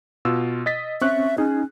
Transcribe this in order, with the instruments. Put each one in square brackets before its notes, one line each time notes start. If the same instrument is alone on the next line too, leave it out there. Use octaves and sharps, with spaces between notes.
[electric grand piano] B2 F4 E6
D#5 A6 B6
[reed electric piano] C4 C#4 [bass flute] E5 [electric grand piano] C#6 F#6
[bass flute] C#4 [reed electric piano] D#4 [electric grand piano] G#4